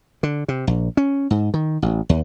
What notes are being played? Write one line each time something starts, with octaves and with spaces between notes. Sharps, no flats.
D3
C3
A#1
C#4
G#2
D#3
A1
D#2